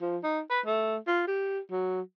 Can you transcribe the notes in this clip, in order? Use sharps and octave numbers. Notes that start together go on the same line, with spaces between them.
F3
D#4
B4
A3
F4
G4
F#3